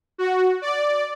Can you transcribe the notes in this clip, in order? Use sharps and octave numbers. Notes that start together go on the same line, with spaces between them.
F#4
D5